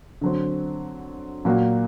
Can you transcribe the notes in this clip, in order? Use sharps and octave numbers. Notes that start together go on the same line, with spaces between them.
D3 F#3 C4
A#2 F#3 A#3 F#4